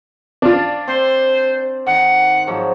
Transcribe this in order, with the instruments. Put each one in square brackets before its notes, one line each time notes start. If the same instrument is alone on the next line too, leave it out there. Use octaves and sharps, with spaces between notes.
[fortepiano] D4 F4 [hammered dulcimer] D5 A5
[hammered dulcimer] C4 [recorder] C5
[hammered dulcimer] D#3 [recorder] F#5
[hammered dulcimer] G#2 F3 F#3